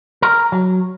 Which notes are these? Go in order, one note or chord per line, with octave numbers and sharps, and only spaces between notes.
A#4
F#3